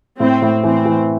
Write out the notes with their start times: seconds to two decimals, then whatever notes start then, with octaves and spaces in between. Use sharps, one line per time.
0.20 A2 C4
0.42 A2
0.64 E3 C4
0.85 E3